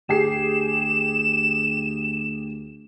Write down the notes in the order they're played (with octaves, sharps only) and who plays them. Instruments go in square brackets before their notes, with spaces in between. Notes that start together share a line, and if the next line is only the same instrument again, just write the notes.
[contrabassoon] D2 [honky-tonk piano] G4 G#4 C7 [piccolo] E7